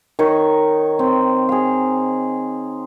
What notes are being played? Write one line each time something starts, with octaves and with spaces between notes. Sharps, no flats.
D#3 D#4 C#5
C4
G#4 F5